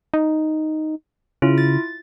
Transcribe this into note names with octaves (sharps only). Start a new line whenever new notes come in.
D#4
C#3 E4 F4
A6